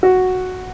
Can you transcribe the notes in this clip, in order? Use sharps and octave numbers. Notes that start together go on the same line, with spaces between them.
F#4